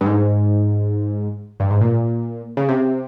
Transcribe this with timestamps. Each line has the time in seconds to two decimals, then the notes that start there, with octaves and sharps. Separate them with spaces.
0.01 G2
0.06 G#2
1.60 G2
1.70 G#2
1.81 A#2
2.57 C#3
2.69 C3